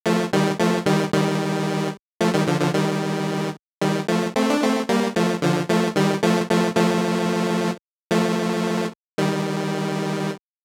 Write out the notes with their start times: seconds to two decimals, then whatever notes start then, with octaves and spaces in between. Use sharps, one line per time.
0.06 F3 A3
0.33 D#3 G3
0.60 F3 A3
0.86 D#3 G3
1.14 D#3 G3
2.21 F3 A3
2.34 D#3 G3
2.47 D3 F3
2.60 D3 F3
2.74 D#3 G3
3.81 D#3 G3
4.08 F3 A3
4.36 A3 C4
4.50 D4
4.62 A3 C4
4.89 G3 A#3
5.16 F3 A3
5.42 D3 F3
5.69 F3 A3
5.96 D#3 G3
6.23 F3 A3
6.50 F3 A3
6.77 F3 A3
8.11 F3 A3
9.18 D#3 G3